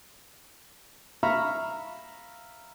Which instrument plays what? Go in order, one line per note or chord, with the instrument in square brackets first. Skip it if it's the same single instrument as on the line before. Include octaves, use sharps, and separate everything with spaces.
[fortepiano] E5 F5 A#5 B5 C#6 F6